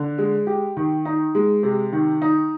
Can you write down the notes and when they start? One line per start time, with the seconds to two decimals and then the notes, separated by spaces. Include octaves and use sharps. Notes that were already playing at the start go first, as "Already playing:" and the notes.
Already playing: D3
0.18 G#3
0.47 G4
0.77 D#3
1.05 D#4
1.35 G#3
1.63 C3
1.93 D#3
2.22 D#4